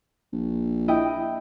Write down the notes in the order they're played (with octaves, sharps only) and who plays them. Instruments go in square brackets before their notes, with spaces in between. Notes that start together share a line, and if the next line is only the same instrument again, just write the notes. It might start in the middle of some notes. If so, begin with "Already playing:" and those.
[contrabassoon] A#1
[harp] E4 D#5 G5